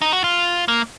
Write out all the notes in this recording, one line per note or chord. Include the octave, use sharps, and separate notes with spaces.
D#4
F#4
F4
A#3